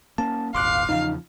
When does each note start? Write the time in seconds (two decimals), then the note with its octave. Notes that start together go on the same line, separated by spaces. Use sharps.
0.18 A#3 C#4 A5
0.55 D#1 G#1 D#2 F5 C6 D6 F#6
0.89 E2 C#3 F3 D#4